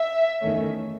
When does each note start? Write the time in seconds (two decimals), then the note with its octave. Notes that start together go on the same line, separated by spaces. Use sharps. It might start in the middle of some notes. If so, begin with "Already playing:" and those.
Already playing: E5
0.41 E2 D#3 A3 C#4